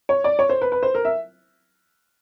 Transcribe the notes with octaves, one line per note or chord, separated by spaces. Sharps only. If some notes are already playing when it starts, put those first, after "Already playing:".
C#5
D5
C#5
C5
B4
B4
C5
A#4
E5